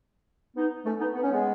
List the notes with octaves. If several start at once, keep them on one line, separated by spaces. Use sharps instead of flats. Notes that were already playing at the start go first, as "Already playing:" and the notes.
B3 D#4
A3 C#4
B3 D#4
B3
C#4
G#3 B3